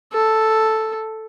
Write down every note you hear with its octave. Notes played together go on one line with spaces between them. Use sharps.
A4